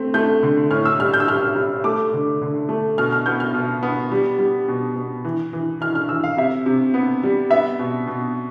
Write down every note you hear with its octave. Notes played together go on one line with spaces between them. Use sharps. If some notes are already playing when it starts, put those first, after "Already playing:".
Already playing: A3 C4
A3 G6
D3
A2 F6
E6
G3 F6
G6
E6
G3 F6
G3
A3 D6
D3
D3
A3
B2 F6
F6
B3 G6
F6
B2
B3
G3
G3
B2
B2
E3
E3
E3 F6
F6
E3 E6
F5
C3 E5
C3
B3
G3
B3 E5
B2
B2